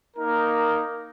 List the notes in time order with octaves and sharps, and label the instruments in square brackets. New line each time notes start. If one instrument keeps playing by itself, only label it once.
[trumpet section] A#3 D#4 A#4